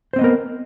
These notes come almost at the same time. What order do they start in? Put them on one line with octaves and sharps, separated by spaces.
C5 C4 D#5 B3 A#4